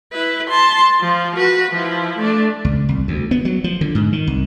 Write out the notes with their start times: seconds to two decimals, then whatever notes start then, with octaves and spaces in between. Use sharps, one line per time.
0.13 E4 B4
0.49 A5 C6
1.01 F3
1.36 F#4 B4
1.71 F3 E4
2.18 A3 D4
2.65 C#2
2.89 C2
3.08 D2
3.31 B3
3.45 F#3
3.64 F3
3.81 D3
3.95 G#2
4.13 D#3
4.27 C2